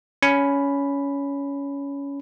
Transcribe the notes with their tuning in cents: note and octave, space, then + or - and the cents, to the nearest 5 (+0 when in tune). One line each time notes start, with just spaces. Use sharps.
C#4 +15 B5 +0